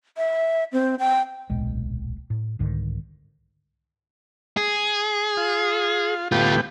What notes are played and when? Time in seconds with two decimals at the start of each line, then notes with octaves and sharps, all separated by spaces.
0.17 E5
0.73 C4
0.99 G5
1.50 D1 B1 A#2 G#3
2.30 A2
2.59 C2 G#2 D3 D#3
4.57 G#4
5.37 F4
6.32 D2 A2 B3 F4 G4